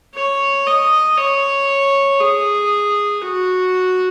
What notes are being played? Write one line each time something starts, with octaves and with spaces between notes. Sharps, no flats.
C#5
D#5
C#5
G#4
F#4